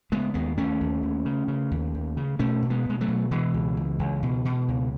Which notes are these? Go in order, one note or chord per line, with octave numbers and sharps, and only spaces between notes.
C#3 G#3 B3
D#2 G#3 B3
D#2 A3 C#4
D#2
D#2
C#3
C#3
D#2
D#2
C#3
B2 A3 C#4
B2
G#3 B3
B2 G#3
F#3 A3
B2
B2 E3 G#3
C#2
C#2
C#2
B2
B2
C#2